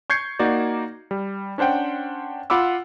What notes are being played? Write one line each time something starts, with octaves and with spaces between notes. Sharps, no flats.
C#6 G6 G#6 C7 C#7
A#3 D#4 F#4 D5
G3
C#4 D4 C5 F#5 G5
F4 F#5 B5 D6 E6